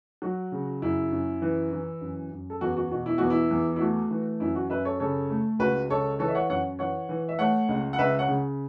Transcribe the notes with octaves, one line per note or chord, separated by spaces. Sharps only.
F#3 F#4
C#3
F#2 E4
F#2
E3
E3
F#2
F#2
A4
E2 F#4
F#4
B2 F#4
E4
E2 F#4
E4
E2
E4
A3 F#4
E3
F#2 E4
F#4
F#2 B4 E5
A4 C#5
C#3 A4 C#5
A3
C#2 F#4 B4
C#2 A4 C#5
E3 A4 C#5
E5
C#5 F#5
F#2 C#5 F#5
E3 C#5 F#5
E3
E5
A3 C#5 F#5
C#2
F#5
C#2 B4 E5
C#5 F#5
C#3